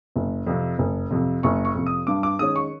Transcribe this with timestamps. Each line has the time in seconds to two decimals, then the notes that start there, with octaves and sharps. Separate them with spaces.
0.16 F#1
0.47 F2 C3
0.79 F#1
1.11 F2 C3
1.43 F#1 C#6
1.65 C#6
1.75 F2 C3
1.86 D#6
2.07 G2 D6
2.23 D6
2.39 D#3 G#3 C#4 D#6
2.56 C#6